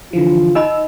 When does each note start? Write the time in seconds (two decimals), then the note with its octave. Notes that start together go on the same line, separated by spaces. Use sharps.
0.13 D3 E3 F3 F4
0.55 D#4 D#5 B5 E6